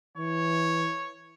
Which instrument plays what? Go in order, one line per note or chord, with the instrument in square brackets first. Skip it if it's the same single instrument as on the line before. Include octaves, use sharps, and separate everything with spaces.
[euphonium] E3 [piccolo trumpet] C#5